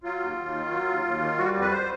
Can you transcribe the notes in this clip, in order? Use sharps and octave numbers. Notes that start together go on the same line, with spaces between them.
F#3 F4
D#2
D#2
D#3
F#3
D#2
D#2
D#3
G3 F#4
F2
B4
C5